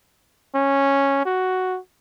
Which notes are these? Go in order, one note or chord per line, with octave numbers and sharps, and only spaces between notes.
C#4
F#4